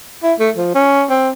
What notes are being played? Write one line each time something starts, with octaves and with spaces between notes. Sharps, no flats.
E4
A3
F3
C#4
C4